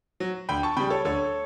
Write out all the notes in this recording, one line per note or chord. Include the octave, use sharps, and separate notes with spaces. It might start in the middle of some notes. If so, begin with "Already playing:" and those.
F#3
D2 G5 B5
A5 C#6
C#3 G3 G5 B5
A4 C#5
D2 A4 C#5